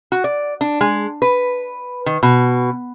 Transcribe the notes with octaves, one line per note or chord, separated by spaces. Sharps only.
F#4
D5
D4
G#3
B4
D#3
B2